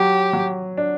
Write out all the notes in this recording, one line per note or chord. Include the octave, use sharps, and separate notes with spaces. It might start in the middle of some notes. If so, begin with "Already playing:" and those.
Already playing: F#3 G4
F#3
D4